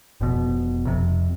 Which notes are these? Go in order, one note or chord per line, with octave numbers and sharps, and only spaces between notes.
F1 B2
F2 C3